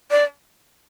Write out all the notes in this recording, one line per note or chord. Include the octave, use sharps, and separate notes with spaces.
D5